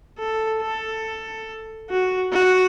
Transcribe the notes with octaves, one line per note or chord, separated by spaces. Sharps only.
A4
A4
F#4
F#4